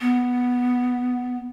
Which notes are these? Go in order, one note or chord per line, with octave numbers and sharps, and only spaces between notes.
B3